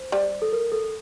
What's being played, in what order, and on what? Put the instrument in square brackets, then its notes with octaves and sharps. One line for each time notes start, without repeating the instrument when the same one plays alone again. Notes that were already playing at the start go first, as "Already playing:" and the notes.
Already playing: [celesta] C5
[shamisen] G3
[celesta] A4
A#4
A4